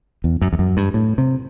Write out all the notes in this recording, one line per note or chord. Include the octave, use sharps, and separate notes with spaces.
E2
F#2
E2
F#2
G2
A2
C3